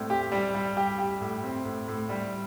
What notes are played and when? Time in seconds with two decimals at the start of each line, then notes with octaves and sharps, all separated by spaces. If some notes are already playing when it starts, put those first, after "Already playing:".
Already playing: A2 G3 C4
0.10 G4
0.32 G3
0.54 G3
0.77 G4
0.98 G4
1.21 A2
1.44 C4
1.65 A2
1.88 A2
2.09 G3